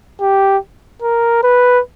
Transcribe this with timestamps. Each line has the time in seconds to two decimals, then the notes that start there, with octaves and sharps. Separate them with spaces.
0.21 G4
1.02 A#4
1.43 B4